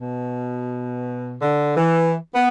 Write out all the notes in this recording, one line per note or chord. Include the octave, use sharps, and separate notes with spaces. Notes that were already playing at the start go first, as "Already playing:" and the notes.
B2
D3
E3
B3